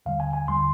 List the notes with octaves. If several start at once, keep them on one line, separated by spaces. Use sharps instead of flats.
D#2 D3 G3 F5
G#5
G#5
D#2 D3 G3 C6